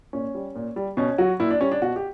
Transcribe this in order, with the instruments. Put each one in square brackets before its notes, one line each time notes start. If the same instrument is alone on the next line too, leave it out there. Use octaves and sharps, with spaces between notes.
[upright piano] A#2 C#4
G3
A#2
G3
B2 C#4
F#3 F#4
A#2 E4
D4
G3 C#4
D4
B2 F#4
G4